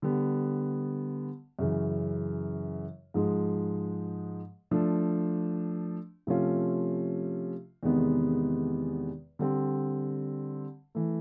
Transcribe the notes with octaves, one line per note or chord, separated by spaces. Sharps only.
D3 G3 B3
F#2 C#3 E3
G#2 F3 G#3
F3 A3 D4
C3 F3 A3 C#4 F4
E2 C3 D#3 G#3 B3
D3 G3 C4
E3 A3